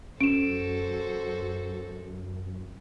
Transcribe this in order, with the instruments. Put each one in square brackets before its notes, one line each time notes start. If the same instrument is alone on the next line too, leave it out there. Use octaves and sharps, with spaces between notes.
[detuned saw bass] F#2 [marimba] C#4 [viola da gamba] F#4 A4 C5 [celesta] D7 E7